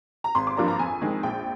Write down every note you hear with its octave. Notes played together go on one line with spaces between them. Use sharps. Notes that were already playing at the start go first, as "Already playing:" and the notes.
A#5
G#1 C6
D6
G2 F3 A#3 D4 A#5
A#5
F2 G#5
D#3 G#3 C4
A#1 G5